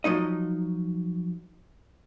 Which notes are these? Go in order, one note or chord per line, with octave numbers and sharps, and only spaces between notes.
F3 F#3 D#4 D#5